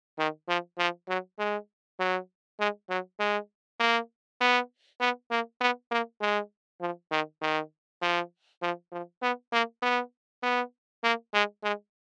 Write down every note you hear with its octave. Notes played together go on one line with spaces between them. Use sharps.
D#3
F3
F3
F#3
G#3
F#3
G#3
F#3
G#3
A#3
B3
B3
A#3
B3
A#3
G#3
F3
D#3
D#3
F3
F3
F3
B3
A#3
B3
B3
A#3
G#3
G#3